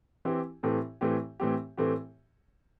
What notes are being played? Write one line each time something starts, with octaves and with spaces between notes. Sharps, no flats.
E3 C4 E4 G4
A2 E3 A3 C4 G4
A2 E3 A3 C4 G4
A2 E3 A3 C4 G4
A2 E3 A3 C4 G4